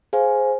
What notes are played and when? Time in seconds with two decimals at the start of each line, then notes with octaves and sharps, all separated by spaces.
0.13 G#4 C5 F5 G#5